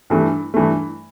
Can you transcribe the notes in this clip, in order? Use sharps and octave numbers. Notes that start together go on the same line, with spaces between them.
G2 E3 A3
G2 E3 A3